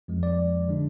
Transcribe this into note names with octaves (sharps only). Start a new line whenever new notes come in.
F2 F3 G#3
D5
D3 G#3 D4